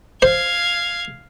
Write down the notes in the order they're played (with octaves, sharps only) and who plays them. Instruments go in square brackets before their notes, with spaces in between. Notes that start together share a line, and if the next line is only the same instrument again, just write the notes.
[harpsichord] C5 [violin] F5 G#6